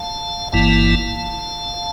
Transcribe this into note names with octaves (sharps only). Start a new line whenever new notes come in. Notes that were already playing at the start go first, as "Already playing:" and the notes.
Already playing: F5 A5
G1 G2 E3 A#3 E4 F5 A5